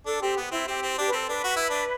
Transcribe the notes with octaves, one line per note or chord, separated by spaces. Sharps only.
D4 A4
C4 G4
B3
C4 E4
C4 G4
C4
D4 G4
B4
C4 A4
D4 B4
F#4
E4
D4